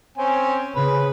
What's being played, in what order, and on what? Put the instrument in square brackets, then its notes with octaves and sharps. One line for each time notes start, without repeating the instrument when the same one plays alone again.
[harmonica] C4 C#4 G#5
[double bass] C#3 [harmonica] B4